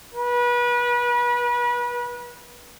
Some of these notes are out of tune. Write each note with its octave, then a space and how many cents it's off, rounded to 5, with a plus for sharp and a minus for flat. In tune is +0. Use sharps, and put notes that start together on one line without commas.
B4 -30